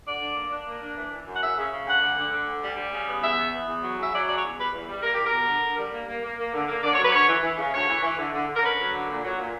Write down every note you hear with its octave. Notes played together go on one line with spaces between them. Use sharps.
D3 D5
D4
A#3
D4
A#3
D4
E3
E3
F#2
F#5
C#3 E5
C#3
C#3
D2 F#5
D3
D3
D3
D2
G3
G3
C#3
B3
E2 E5
B3
B3
E2
F#3
C#3 E5
F#3 D5
C#3 D5
C#5
E2
G3 B4
E2
G3
A#3 A#4
E2 G4
A#4
B2
D3
D3
G3
A#3
A#3
A#3
A#3
D3
A#3
D3 D5
C#5
F#3 B4
D3 C#5
E3
E3
C#3
D2 C#5
E3
E3
D3
D3
D3
A#4
C#4 B4
F#3
D3
A#2
F#3
A#2